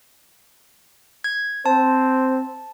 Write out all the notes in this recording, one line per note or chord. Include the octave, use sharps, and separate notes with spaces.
G#6
C4 C5 A5